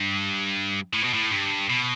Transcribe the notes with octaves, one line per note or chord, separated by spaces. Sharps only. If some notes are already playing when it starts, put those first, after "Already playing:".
Already playing: G2
A2
B2
A2
G2
B2